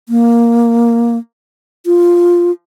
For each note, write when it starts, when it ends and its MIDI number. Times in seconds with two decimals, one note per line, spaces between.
0.09 1.17 58
1.86 2.52 65